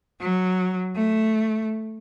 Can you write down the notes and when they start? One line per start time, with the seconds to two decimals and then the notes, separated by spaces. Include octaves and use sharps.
0.21 F#3
0.96 A3